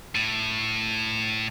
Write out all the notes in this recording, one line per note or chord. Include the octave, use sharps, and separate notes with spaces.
A2